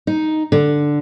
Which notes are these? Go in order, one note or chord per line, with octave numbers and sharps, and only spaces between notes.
D#4
D3